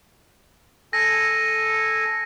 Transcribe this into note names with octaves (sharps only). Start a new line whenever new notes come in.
A4 G#5 A#6